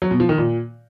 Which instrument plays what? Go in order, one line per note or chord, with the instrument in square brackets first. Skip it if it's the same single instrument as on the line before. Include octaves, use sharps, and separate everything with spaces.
[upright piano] F#3
B2
F3
D#3
A#2